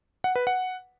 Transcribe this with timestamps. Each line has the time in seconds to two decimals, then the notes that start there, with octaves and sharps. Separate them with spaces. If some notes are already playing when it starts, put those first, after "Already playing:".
0.24 F#5
0.36 B4
0.47 F#5